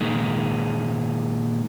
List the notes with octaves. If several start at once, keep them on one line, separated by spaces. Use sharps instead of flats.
A#2 D#3 G#3